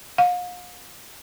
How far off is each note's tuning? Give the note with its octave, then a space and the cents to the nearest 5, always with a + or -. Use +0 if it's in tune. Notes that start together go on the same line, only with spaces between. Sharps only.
F5 +40